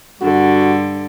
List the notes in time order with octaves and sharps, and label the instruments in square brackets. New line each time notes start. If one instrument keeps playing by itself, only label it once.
[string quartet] G2 D3 [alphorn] F#4